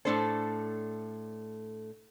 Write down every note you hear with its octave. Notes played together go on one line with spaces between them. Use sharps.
A2 A3 D4 A4 C5